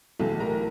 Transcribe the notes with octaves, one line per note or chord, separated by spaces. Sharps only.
B1 A2 E3 A4 A5
A#4 A#5